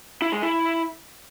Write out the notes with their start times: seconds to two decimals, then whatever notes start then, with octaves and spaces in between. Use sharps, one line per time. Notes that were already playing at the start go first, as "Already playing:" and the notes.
0.22 E4
0.32 G#3
0.42 E4